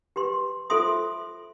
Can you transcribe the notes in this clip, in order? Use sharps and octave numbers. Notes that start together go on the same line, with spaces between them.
G4 B4 C6
F4 A4 C5 E5 C6 D#6